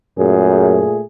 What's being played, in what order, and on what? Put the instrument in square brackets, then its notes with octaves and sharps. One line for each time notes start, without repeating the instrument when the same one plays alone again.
[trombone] F#2 [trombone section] A#2 A3 G#4